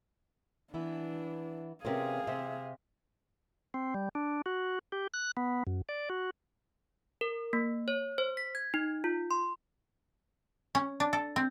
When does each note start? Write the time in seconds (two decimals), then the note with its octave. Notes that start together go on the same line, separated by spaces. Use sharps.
0.74 E3 B3 D4 E4
1.85 C3 B3 C#4 F4 G#4 A#4 C5 F5
2.27 C3 E5
3.74 C4
3.94 G3
4.15 D4
4.46 F#4
4.92 G4
5.14 F#6
5.37 B3
5.67 F#2
5.89 D5
6.10 F#4
7.21 A#4
7.53 A#3
7.88 C#5
8.18 C5
8.37 B6
8.55 G#6
8.74 D#4
9.04 F4
9.31 C6
10.75 C#4
11.00 D4
11.13 A4
11.36 C4